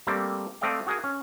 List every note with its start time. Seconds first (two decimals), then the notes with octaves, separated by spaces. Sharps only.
0.07 G3 A3 A#3 C4
0.61 A3 C4 D5 D#5 F5 G5
0.87 F#4 G#4 A#4 G#5
1.04 C#4